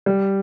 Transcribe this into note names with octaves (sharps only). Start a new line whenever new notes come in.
G3